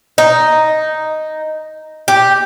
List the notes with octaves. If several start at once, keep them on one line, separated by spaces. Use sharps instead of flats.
D#4
G4